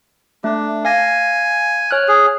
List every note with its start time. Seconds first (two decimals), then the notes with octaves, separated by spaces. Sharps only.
0.44 A3 D4
0.85 F5 G#5 A#6
1.91 C#5 F6 F#6
2.08 G#4